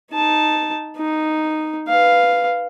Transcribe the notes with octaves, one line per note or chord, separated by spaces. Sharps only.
D#4 A5
D#4
B4 F5